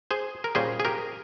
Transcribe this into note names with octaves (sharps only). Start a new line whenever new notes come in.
G#4 C5
A#4
A#2 G3 C#4 G#4 C5
G#4
G4 A#4